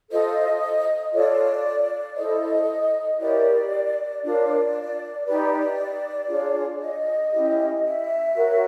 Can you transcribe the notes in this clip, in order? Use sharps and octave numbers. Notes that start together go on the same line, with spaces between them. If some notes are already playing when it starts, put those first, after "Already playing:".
F4 A4 C5 D#5
F4 A4 C#5 D5
E4 A4 C5 D#5
E4 G4 A#4 C#5 D5
D4 F4 A#4 C#5 D5
D#4 G4 B4 D5
D4 F4 G#4 C#5
D#5
C#4 E4 G4
E5
F#4 A#4 C#5